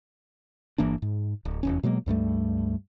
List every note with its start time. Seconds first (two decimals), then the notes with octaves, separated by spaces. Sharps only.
0.78 G1 E3 A#3 D4
1.02 G#2
1.45 D1
1.63 F1 E2 C#4
1.83 B2 F#3 G#3 A#3
2.06 C#2 G2 G3 A3